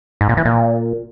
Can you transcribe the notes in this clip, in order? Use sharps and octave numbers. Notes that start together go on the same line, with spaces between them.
G#2
A#2
E3
A#2